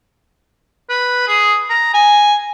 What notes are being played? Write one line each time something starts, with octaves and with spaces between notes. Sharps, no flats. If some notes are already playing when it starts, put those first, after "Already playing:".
B4
G#4
A#5
G#5